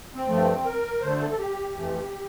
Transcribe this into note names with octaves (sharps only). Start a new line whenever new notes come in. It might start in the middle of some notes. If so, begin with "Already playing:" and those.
C4
G2 F3 A3
A#4
D2 D3 A3 C5
A4
A4
G4
F2 E3 A3